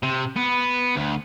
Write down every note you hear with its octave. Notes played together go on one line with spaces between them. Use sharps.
C3
B3
D2